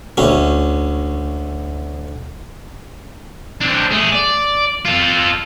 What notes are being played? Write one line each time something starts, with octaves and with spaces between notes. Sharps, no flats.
D2 C#4
C4 D4
A3 G#4
D5
F4 A4